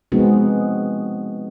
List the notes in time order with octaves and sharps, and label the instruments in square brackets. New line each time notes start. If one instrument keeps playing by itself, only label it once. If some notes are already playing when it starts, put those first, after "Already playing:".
[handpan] F3 G#3 B3 C4 D#4 F#4